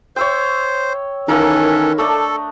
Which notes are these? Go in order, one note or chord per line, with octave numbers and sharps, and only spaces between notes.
C5 C#5 E5 G5
D#3 E3 A#3 C#4 E4 A4 A#4
A3 D4 A4 D#5